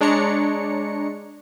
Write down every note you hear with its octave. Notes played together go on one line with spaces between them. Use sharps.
G#3 D4 C#5 A#5 C#7